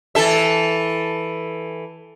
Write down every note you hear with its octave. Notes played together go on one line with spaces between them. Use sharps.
E3 A4 E5